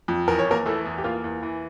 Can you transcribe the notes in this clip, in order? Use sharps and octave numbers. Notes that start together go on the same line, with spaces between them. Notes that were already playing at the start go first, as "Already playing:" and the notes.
F2
E2 A#4
C#5
E2 A#3 A#4
E3 A3 A4
E2
G4
A#3 F4
E2
E3